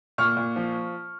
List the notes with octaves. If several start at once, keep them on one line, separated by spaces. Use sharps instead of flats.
A#2 C#6 F6
A#2
F3